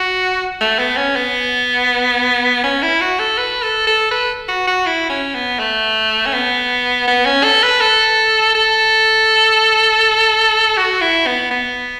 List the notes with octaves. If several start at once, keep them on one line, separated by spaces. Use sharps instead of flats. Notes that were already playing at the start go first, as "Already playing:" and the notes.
Already playing: F#4
A3
B3
C#4
B3
C#4
E4
F#4
A4
B4
A4
A4
B4
F#4
F#4
E4
C#4
B3
A3
C#4
B3
B3
C#4
A4
B4
A4
A4
F#4
E4
B3
B3